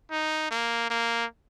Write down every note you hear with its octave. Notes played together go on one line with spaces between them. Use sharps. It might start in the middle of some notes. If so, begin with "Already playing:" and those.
D#4
A#3
A#3